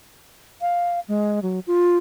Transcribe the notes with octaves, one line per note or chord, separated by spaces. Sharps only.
F5
G#3
F#3
F4